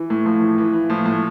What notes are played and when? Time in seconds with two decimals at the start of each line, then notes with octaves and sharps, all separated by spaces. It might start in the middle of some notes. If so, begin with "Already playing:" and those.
Already playing: E3
0.10 A2
0.25 A2 F3
0.41 E3
0.58 E3
0.73 E3
0.90 A2 F3
1.06 A2